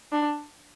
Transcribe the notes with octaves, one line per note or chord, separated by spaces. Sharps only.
D4